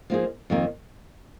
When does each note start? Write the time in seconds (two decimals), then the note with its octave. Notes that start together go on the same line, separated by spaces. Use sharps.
0.10 F3 A#3 D#4 G#4
0.50 F2 D#3 A#3